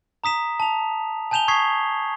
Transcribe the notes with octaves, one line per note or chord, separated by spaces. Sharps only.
A#5 D#6 B6 E7
A5 F7
G#5 A5 G6 E7 F7 G7
C#6 D#6 G#6 B6 C7